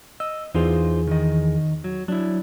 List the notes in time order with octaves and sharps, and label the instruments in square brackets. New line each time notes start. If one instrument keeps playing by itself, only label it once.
[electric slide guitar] D#5 [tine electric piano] E6
[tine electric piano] E2 E3 G#4 [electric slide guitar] D#4 F4 C5
[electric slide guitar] D#3 D#5
F#3
[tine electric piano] F#3 [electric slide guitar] D4 E4